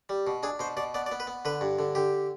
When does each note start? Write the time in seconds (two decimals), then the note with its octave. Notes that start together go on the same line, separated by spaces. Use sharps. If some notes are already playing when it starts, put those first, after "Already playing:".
0.09 G3
0.27 B2
0.43 D4 G#4
0.59 B2 C5
0.77 B2 D5
0.94 B3 D5
1.06 D5
1.12 B3
1.20 B4
1.27 B3
1.45 D3 B4
1.61 G2
1.79 D3
1.95 D3 G4